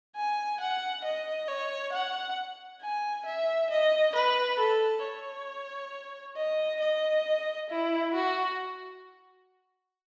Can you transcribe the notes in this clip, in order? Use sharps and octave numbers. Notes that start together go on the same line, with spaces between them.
G#5
F#5
D#5
C#5
F#5
G#5
E5
D#5
B4
A4
C#5
D#5
D#5
E4
F#4